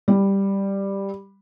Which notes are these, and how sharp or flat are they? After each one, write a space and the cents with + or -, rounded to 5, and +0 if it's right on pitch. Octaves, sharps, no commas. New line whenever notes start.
G3 +5